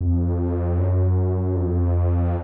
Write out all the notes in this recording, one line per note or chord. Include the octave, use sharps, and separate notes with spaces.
F2
F#2
F2